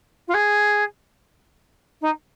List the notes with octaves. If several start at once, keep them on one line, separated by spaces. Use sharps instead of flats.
F4
G#4
D#4